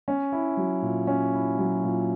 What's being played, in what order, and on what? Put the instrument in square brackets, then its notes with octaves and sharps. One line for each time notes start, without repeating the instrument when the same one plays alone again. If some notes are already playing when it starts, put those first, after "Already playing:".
[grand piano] C#4
E4
F#3
A#2
C#4
E4
F#3
A#2